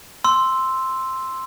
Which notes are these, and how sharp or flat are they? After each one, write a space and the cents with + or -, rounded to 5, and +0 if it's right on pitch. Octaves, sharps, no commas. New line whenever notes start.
C6 +0 E6 +0